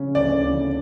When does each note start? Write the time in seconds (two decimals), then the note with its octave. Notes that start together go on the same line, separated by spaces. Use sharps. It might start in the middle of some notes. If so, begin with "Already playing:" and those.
Already playing: C#3 C#4
0.15 D2 D5
0.45 C#3